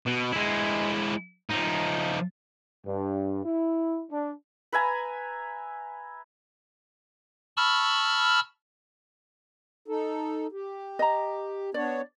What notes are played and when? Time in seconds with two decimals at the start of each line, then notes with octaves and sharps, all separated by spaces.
0.07 B2
0.32 G#3 E4
1.50 F3 D#4
2.86 G2
3.44 E4
4.11 D4
4.72 B4 E5 G#5 A#5
7.57 A5 B5 C#6 E6 F6
9.88 D#4 A4
10.52 G4
10.99 D#5 A#5
11.74 B3 D4 C#5 D5